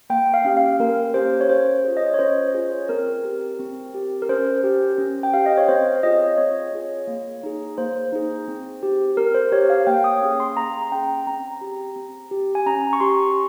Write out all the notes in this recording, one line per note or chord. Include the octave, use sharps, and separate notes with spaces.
A#3 G5
F5
C#4 G4
F5
A#3 A#4
C#4 G4 C5
C#5
C#4 C5
F4 G#4
D#5
C#5
C#4 C5
F4 G#4
C4 A#4
G4
C4
G4
A#4
C#4 C5
G4
C#4
G5
G4 F5
D#5
C#5
C4 C5
F4 G#4 D#5
C4 C#5
F4 G#4
A#3
D#4 G#4
A#3 C5
D#4 G#4
C4
G4
C4 A#4
C5
G4 C#5
F5
A#3 G5
D#6
C#4 G#4
C6
A#3 A#5
C#4 G#4 G5
C4 A#5
G4
C4
G4
G#5
C#4 A#5
C#6
G4 C6